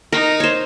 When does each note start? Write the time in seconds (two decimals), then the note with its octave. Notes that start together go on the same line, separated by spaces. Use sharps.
0.12 D#4 A#4
0.40 C5 C#5